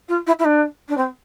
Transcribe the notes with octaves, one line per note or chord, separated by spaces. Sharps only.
F4
E4
E4
D4
D4
C4